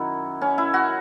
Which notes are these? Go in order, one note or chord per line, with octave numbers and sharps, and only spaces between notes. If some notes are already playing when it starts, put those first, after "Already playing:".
Already playing: F#2 D#3 E4 F#4
C#4
E4
F#4